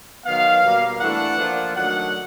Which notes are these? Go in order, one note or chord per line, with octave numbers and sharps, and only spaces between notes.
D#3 F#3 B3 F5
B2 G3 A#3
E3 A3 D4 F#5
F3 A#3 D4 F4
D#3 F#3 A3 D4 F#5